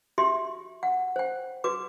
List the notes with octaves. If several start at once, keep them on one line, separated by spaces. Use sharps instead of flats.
F#4 G4 E5 C6
F#5
C5 G5
F#4 B4 D6